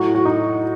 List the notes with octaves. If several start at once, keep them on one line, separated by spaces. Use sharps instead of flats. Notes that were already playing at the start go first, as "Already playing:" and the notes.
Already playing: A2 F#3 F#4
F#4
D#4